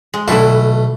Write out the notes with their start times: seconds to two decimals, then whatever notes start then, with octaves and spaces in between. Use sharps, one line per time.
0.14 G#3
0.28 B1 A#2 D3 A3 E4 B4